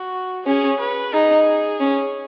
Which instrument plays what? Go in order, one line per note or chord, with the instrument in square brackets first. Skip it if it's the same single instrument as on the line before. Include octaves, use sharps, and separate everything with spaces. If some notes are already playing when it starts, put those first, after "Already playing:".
Already playing: [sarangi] F#4
[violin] C#4 [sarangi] G#4
[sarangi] B4
[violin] D#4 [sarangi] G#4
[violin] C#4